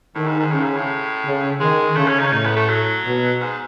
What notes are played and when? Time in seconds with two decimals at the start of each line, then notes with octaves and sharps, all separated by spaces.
0.15 A2 D#3
0.27 G#2
0.39 G#2
0.51 A2 C#3
0.63 G#2
0.76 A2
1.24 C#3
1.60 D#3 G#3
1.96 C#3 A3
2.08 C#4
2.20 D#4
2.27 C#4
2.32 A2 D#4
2.45 B3
2.56 A3
2.69 F#3
3.05 B2
3.41 G#2